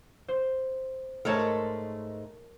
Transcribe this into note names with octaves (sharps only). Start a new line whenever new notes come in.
C5
G#2 G#3 A3 A#4 C#5 A5